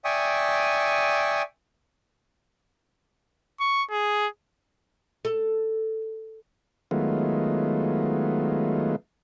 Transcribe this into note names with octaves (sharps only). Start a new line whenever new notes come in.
D5 E5 G5 G#5 C#6 D#6
C#6
G#4
A4
D#3 F#3 G#3 A3 B3 F4